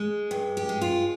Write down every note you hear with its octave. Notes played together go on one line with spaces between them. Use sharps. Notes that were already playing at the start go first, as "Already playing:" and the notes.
Already playing: G#3
G2
G4
G#3
F4